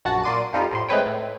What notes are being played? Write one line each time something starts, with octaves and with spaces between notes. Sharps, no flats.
A#1 F#2 F#4 F#5 A5
A#2 A#3 D5 C6 D6 D#7
F2 F3 G3 D#4 F4
F2 A2 C6
G#3 A3 C4 B4 C#5 G5
A2